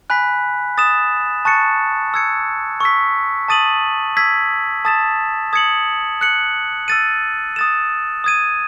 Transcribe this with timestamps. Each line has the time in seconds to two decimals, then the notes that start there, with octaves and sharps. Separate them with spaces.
0.10 G#5 B5 F#6 B6
0.78 D#6 A6 E7
1.45 A5 C#6 F#6 A6 C#7
2.14 E6 G#6 C#7
2.80 C#6 E6 B6
3.48 A5 D#6 A6 D#7 F#7
4.17 E6 G#6 B6
4.85 A5 D#6 A6 E7
5.53 D#6 G#6 C#7 F#7
6.21 F#6 C#7 F#7
6.88 E6 A6 D#7
7.56 D#6 A6 E7
8.24 D#6 G#6 D#7